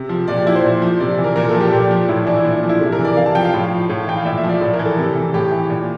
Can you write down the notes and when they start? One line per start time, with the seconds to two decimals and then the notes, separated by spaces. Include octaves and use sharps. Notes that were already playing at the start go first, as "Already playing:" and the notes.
Already playing: C3
0.09 F3
0.28 A#2 D5
0.37 G4
0.46 F3 E4
0.55 C5
0.64 A#2
0.82 F3
1.00 C3 D5
1.18 E3
1.24 A#4
1.36 A#2 A#4
1.49 A4
1.54 F3
1.61 G4
1.73 A#2 G4
1.91 F3
2.08 A2 E4
2.27 E3 D4
2.36 E4
2.45 A#2 D4
2.57 D4
2.63 F3
2.69 E4
2.80 C3 A4
2.92 A#4
2.99 E3
3.04 D5
3.17 C3 F5
3.26 A5
3.35 F3 G5
3.45 F5
3.53 A2
3.71 F3
3.89 A2
4.07 E3 G5
4.17 F5
4.25 A#2 E5
4.38 E5
4.44 F3
4.49 D5
4.61 A2
4.74 A#4
4.79 E3
4.85 A4
4.98 C3
5.16 E3
5.34 A2 G4
5.52 E3
5.69 A#2